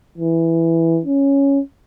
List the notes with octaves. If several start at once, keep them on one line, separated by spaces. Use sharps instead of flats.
E3
C#4